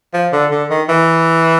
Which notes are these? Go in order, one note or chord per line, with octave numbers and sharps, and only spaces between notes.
F3
D3
D3
D#3
E3